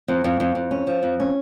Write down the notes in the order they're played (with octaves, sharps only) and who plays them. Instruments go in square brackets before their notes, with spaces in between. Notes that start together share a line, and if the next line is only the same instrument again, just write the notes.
[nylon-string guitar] F2
F2
F2
F2
C#4
F3
F2
C#4